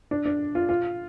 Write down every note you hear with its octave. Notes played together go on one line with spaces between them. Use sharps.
D4
D4
F4
F4